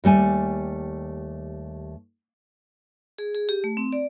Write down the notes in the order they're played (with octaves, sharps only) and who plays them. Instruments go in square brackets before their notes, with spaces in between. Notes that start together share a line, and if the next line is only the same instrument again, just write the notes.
[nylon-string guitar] D#2 G3 A3 G#5
[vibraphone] G#4
G#4
G4
A3
C4
D5